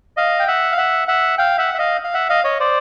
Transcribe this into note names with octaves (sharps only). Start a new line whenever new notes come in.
D#5 F5
G5
E5 F#5
F5
E5 F#5
E5 F#5
F5 G5
E5 F#5
E5
D#5 F5
F5
E5 F#5
D#5 F5
C#5 D#5
C5 D5